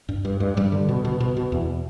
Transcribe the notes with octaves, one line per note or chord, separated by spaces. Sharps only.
G2
G2
G2
G2 G3
D3
B2
B2
B2
B2
E2